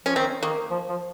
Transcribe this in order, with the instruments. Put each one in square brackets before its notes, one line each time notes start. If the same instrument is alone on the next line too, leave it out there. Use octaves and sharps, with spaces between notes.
[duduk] F3 [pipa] C#4
[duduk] D#3 [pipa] C4
[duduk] D#3 [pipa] A#3
[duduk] F3
F3